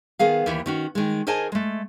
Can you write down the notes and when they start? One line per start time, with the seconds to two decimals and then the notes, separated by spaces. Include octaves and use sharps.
0.19 D#3 B3 G#4 F5
0.46 D#2 E3
0.66 D#3 C#4 F#4
0.95 D#3 G#3
1.27 G#4 A#4 C5 D#5 G#5 A5
1.52 G#3 A3